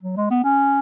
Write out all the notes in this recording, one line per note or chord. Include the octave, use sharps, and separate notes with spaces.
F#3
G#3
B3
C#4